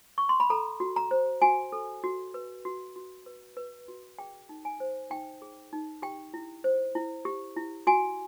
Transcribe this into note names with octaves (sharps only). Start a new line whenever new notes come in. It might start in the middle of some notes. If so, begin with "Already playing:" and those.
C#6
C6
B5
A4 A#5
F#4
A#5
C5
F#4 G#5
A4
F#4
B4
F#4
F#4
B4
B4
F#4
G#4 G5
D#4
G#5
C5
D#4 G5
G#4
D#4
G4 G5
E4
C5
E4
G4
E4
F#4 G#5